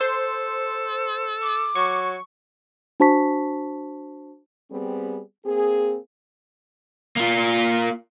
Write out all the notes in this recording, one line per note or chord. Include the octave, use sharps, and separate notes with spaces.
A4 C5
D6
F#3 C#6
D4 F#4 C5 A5 C#6 B6
G3 B3 C4 G#4
A#3 C4 G#4
A#3 F4